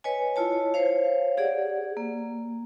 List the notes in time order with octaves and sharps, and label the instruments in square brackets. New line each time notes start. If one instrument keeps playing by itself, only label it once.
[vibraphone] B4 C#5 D#5 G#5
E4 F4 C#5 A5
C5 C#5 F5
G4 G#4 D5 F#5
A#3